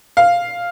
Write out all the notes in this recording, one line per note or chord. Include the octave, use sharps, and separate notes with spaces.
F5